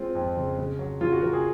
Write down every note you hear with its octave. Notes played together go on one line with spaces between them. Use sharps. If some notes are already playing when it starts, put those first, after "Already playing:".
Already playing: G#3 C4 F4
F2
C#3
C#3
F#3
C#3 F4
F#4
C#3 A#4
G#4